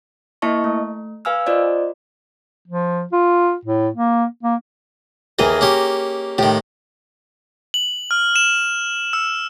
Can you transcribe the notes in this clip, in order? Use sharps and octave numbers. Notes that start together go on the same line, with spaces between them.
A#3 E4 D#5 A5 C#6
A3
B4 F5 G#5 E6 F6
F4 C5 D5 D#5
F3
F4
A2
A#3
A#3
D#2 E3 G#4 A#4 D#5
A#3 C#4 G4
A2 D#3 G4
F#7
F6
E7
E6